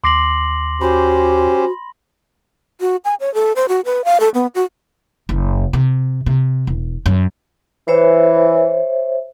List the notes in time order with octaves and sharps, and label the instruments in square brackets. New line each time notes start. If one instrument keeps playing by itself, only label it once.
[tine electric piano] D#2 D6 C7 [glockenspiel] C6 A#6 F#7
[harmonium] C#4 G4 C5 [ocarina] F#4 [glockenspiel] B5
[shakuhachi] F#4
G#5
C#5
A4
C5
F#4
B4
F5
A4
B3
F#4
[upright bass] F#1
C3
C3
E1
F#2
[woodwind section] E3 [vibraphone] C5 C#5 E5